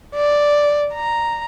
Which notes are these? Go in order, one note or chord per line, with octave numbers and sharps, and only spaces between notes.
D5
A#5